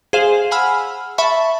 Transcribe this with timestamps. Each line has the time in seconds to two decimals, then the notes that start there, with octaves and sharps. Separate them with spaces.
0.13 G#4 C5 F5
0.51 F#5 G#5 B5 E6 F6
1.18 E5 A5 B5 C#6